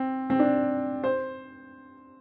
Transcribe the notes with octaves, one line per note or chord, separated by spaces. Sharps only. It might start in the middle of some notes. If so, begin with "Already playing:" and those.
Already playing: C4
C4
D4
C5